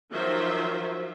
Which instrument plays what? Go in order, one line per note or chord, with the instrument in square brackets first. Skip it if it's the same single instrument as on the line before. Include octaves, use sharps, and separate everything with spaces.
[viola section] D#3 F3 F#3 F4 C5 E5